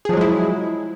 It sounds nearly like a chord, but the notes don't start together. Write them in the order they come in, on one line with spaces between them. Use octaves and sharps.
G#4 F3 F#3 G#3 E4